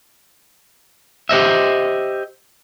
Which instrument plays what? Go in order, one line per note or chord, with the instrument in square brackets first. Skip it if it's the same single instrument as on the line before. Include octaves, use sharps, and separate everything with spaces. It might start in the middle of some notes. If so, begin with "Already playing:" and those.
[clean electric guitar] G4 C5 D#5 E5